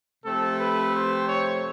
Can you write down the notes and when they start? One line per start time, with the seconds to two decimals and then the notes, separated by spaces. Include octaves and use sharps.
0.24 C3 F3 A3 C4 A4
0.59 B4
0.93 C5
1.28 C#5